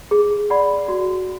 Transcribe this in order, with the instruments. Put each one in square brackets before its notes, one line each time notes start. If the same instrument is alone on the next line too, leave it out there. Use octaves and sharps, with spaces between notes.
[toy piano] G#4
D5 F#5 B5
F#4